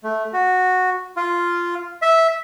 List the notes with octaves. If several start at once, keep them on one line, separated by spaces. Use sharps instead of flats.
A3
F#4
F4
E5